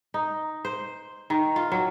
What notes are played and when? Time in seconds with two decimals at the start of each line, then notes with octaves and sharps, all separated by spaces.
0.14 D#4
0.65 C5
1.30 D#3
1.56 F4
1.72 F#3